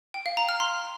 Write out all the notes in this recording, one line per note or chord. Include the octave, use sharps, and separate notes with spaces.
G5
F5
A#5
F6
C6